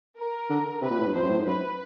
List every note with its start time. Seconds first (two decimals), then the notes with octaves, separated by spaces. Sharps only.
0.18 A#4
0.50 D3
0.82 C3 B4
0.90 A#2
0.99 A2
1.06 G2
1.14 F2 C5
1.23 F#2
1.30 A2
1.38 G#2
1.46 F#2 B4